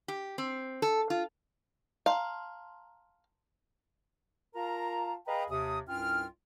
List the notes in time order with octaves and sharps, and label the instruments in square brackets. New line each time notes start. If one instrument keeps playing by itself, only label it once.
[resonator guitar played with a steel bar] G4
C4
A4
F4
[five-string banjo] F5 [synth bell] A5 A#5 C6
[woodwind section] F4 A#4 F5 A5 A#5
G#4 B4 D#5 F5 G5 A#5
D#2 C3 D#6
C2 G2 C#4 F4 G5 F6